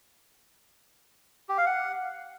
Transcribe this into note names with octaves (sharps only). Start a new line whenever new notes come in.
G4
F5
F#5